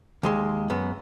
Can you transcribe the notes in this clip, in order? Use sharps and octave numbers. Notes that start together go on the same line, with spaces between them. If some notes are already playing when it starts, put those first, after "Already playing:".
D#2 G#3 C6
F#2 B3